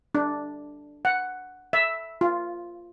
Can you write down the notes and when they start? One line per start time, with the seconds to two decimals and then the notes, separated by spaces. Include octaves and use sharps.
0.15 D4
1.05 F#5
1.73 E5
2.21 F4